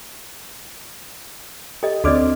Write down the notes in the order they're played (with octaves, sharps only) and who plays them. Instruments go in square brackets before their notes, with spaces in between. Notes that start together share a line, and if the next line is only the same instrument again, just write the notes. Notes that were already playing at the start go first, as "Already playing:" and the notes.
[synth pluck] G4 [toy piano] A4 D#5
[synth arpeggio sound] D2 D6 F6 [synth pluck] C4 D4 [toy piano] F#4 D5 D#5